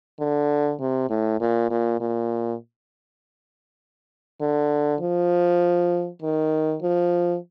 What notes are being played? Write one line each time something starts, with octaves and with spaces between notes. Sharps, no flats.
D3
C3
A2
A#2
A#2
A#2
D3
F3
D#3
F3